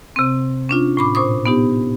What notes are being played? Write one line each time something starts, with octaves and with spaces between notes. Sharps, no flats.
C3 C4
C#4 D4 F4
A2 B5 D6
A#2 C5 C#6 D#6
B3 D#4 G4